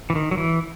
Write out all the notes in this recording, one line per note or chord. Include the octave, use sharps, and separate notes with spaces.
E3
D#3
F#3
E3